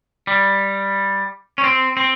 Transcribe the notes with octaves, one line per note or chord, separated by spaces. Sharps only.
G3
C#4
C4
C4